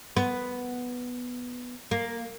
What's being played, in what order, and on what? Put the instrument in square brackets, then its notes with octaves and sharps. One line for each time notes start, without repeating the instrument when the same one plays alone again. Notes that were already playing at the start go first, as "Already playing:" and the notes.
[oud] B3
A#3